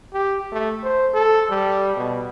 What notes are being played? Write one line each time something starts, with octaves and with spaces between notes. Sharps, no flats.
G4
A3
C5
A4
G3
B2